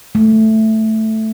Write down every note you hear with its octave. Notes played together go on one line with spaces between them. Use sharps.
A3